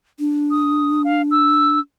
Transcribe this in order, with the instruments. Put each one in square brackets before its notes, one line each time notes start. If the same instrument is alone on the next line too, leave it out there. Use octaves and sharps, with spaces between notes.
[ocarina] D4
[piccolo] D#6
F5
E6